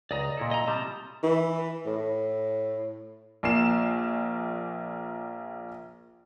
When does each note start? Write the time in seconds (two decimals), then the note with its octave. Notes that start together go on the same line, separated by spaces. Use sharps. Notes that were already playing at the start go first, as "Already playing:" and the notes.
0.11 C#2 D5 D#5 A#5
0.37 A#2 E4 A4
0.51 D#5 A#5
0.68 C3 G3 A5 D#6
1.23 E3
1.86 A2
3.43 A#1 A#3 C7 E7